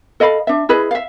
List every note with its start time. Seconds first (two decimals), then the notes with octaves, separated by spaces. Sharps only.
0.20 A4 D#5 F5 B5
0.47 D4 E5
0.69 E4 G#4 B4 D#5
0.91 E5 F5